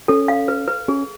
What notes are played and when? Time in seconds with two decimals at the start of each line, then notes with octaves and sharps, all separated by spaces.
0.08 C#4 A4
0.28 F5
0.48 B4
0.68 B4
0.88 C#4 G#4